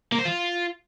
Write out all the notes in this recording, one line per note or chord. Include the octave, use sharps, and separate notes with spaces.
A#3
C5
F4